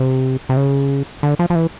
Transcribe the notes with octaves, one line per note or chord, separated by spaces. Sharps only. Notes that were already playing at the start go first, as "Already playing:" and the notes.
Already playing: C3
C3
C#3
D3
F3
F3
E3